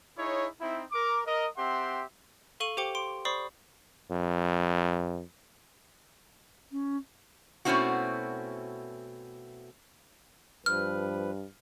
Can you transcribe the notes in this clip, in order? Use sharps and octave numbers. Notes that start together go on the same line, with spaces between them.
D#4 E4 G#4 C#5
C4 D#4 E4
A#4 D6
A#4 D#5
C4 G4 E5 F#5 C6
A4 F5 C#6 D#7 F#7
G4 C5 G5 D6 C#7 G7
C6 D7
C5 D5 B5 C#6 D#6 C7
F2
C#4
B2 A3 C4 C#4 E4 F#4
G2 F3 B4 F6